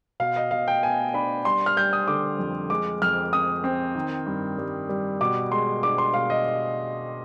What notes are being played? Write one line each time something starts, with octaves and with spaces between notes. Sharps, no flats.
B2 F5
D#5
B2 F5
G5
B3 G#5
D4 B5
G3 C6
F6
G3 G6
D#6
D3 D6
F2
G#3 D6
F2 F6
C4 D#6
C4
D#3
G2
G3
G3
B2 D6
G#3 C6
D4 D6
C6
B2 F5
D#5